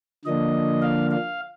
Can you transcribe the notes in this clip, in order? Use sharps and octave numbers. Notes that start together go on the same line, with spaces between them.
D3 F3 A#3 D4 D#5
F5
F5